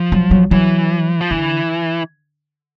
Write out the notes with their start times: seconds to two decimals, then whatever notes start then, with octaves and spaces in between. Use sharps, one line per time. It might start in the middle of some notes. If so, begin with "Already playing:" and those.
Already playing: F3
0.12 F#3
0.31 F#3
0.51 E3 F#3
1.21 F3
1.31 D3 E3